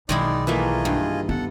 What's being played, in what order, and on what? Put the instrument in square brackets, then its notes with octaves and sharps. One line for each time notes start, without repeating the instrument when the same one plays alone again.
[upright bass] B1 [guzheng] D#3 G#3 E4 [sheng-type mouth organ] D#4 D5
[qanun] E3 A3 A#3 [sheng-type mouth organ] F4 G#4 D#5
[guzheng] G2
[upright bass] B3 [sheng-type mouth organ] A4 F#5